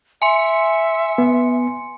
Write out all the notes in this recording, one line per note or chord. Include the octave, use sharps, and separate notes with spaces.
E5 G#5 C6 C#7
B3